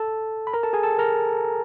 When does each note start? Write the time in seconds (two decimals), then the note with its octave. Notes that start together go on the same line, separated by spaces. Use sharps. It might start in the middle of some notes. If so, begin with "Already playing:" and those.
Already playing: A4 A5
0.47 B5
0.53 A#4 A#5
0.63 A4 A5
0.73 G#4 G#5
0.83 A4 A5
0.99 A#4 A#5